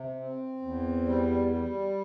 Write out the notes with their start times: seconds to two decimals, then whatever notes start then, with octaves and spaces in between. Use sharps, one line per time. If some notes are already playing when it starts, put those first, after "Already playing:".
Already playing: C3
0.20 C4
0.62 E2
1.06 G3
1.48 G3